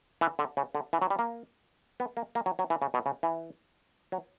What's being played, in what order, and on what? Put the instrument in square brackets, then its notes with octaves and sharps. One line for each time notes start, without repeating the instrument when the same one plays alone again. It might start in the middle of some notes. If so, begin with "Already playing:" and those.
[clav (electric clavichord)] E3
D3
C#3
D3
E3
F#3
G3
A#3
B3
A#3
A#3
F#3
F#3
E3
C#3
B2
C#3
E3
F#3